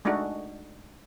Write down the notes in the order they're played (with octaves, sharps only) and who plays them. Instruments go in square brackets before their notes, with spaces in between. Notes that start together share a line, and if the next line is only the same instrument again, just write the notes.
[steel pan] G#3 A3 D4 D#4 F#4